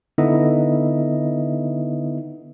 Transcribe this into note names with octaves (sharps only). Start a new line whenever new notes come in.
D3 B3 D#4 E4 D#5 E5